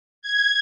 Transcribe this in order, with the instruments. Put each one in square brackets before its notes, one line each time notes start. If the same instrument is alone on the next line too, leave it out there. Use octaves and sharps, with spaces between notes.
[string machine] G#6